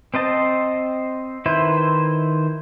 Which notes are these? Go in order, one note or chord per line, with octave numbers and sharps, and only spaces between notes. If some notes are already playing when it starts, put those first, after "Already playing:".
C4 C5 D#5 A5
D#3 E4 B4 C5